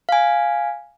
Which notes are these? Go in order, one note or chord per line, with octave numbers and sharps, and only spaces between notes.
F5 G#5